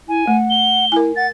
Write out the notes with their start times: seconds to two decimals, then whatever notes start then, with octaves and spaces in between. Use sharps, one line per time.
0.09 E4 G#5
0.27 A3 F#5
0.50 G7
0.92 E4 A#4 G#5
1.16 F#5 A6